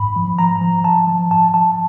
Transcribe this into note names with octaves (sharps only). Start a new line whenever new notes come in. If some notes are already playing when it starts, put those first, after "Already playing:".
Already playing: G#2 B5
F3
F3 A#5
F3
F3 A5
F3
G#2 A5
F3 A5